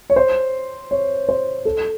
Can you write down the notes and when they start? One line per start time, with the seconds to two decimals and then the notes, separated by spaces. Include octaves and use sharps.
0.10 C#5
0.16 C5
0.91 C#5
1.29 C5
1.65 A4